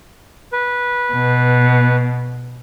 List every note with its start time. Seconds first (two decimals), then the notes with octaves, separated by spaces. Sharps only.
0.53 B4
1.13 B2